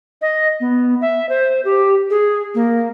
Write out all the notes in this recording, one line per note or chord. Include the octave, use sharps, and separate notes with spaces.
D#5
B3
E5
C5
G4
G#4
A#3